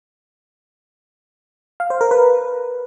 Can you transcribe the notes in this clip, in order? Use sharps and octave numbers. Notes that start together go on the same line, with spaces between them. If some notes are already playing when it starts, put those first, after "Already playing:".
F5
C5
A#4
B4